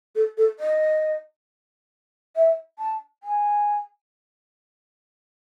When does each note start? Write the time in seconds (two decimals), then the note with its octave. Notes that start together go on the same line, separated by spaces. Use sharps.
0.16 A4
0.38 A4
0.59 D#5
2.36 E5
2.79 A5
3.23 G#5